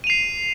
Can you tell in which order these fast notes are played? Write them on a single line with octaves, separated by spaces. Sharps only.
D#7 F7 C7